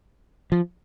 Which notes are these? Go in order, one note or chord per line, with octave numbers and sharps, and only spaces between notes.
F3